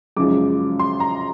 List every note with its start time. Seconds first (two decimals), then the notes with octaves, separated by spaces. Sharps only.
0.16 F#2 C#3 F3 G#3 D6
0.79 C6
1.00 A#5